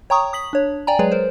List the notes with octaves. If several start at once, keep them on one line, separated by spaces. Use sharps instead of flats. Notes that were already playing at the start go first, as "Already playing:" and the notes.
C#5 G5 A#5 C#6 D#6
D#6 B6 F#7
D4 C#5
D5 G5 G#5 A#5
F#3 G#3 G#4 B4 C#5 D5
A#4 C5